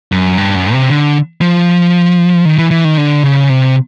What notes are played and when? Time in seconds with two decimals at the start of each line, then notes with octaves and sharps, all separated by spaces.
0.12 F#2
0.38 G2
0.55 F#2
0.72 C3
0.90 D3
1.41 F3
2.45 D#3
2.58 E3
2.71 E3
2.85 D#3
2.97 D3
3.24 C#3
3.50 C3